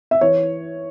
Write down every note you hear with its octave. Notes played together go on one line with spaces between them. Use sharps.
E5
E3 C#5